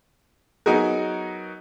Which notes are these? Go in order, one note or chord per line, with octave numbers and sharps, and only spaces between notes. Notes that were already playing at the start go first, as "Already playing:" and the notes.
F#3 B3 D#4 F#4 G#4 A#4